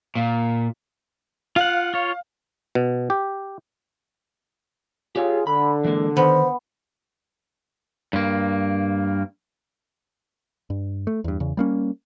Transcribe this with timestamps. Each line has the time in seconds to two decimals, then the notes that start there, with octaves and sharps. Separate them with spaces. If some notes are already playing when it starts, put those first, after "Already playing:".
0.15 A#2
1.56 F4 F5 F#5
1.94 F4 C#5
2.75 B2
3.10 G4
5.16 F4 G4 G#4 C#5
5.47 D3 B5
5.85 E3 G#3 A#3
6.17 D#3 B3 C5
8.13 G2 A#3
10.70 G2
11.07 A3
11.24 E2 G2
11.40 E2 C#3
11.57 G3 A#3 C#4